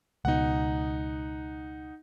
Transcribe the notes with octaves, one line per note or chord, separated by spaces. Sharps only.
C#2 B2 D#4 F#5